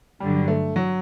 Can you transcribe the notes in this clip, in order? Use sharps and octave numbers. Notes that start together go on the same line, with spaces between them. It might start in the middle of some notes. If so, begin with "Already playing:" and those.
G2 D3 F#3 G3
A3
F#3